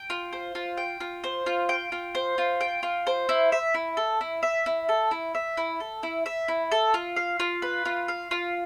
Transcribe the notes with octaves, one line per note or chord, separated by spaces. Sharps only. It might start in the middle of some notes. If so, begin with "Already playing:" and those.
Already playing: G5
F4
C5
F4
G5
F4
C5
F4
G5
F4
C5
F4
G5
F4
C5
E4
E5
E4
A4
E4
E5
E4
A4
E4
E5
E4
A4
E4
E5
E4
A4
F4
F5
F4
B4
F4
F5
F4